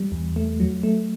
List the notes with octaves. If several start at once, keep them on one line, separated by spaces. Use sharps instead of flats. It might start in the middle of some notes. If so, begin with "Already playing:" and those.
Already playing: G3
E2
A3
F#3
A3